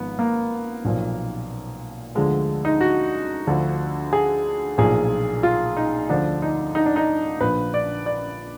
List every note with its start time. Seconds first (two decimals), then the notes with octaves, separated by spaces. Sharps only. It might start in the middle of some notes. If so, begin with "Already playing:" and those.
Already playing: G#1 G#2 F3 B3
0.19 A#3
0.85 B1 A#2 F3
2.15 D2 D3 F3 G#3
2.65 D#4
2.81 F#4
3.47 D2 D3 F3
4.13 G#4
4.78 B1 A#2 F3 G#4
5.43 F4
5.77 D#4
6.09 D2 D3 F3 D4
6.42 D#4
6.75 D#4
6.86 D4
6.96 D#4
7.40 A#1 A#2 F3 B4
7.74 D5
8.06 D5